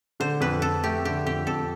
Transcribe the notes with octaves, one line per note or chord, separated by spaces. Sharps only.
D3 C5
F2 B4
F2 A4
A3 G4
D3 G4
F2 G4
F2 A4